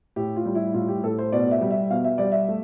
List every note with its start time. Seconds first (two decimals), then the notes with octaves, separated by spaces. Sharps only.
0.16 A2 G4
0.36 F4
0.45 G3
0.55 E4
0.74 A2 F4
0.88 G4
1.03 A2 A4
1.19 C5
1.32 B2 D5
1.51 E5
1.61 G3
1.71 E5
1.90 B2 F5
2.04 E5
2.18 G3 D5
2.32 E5
2.48 A3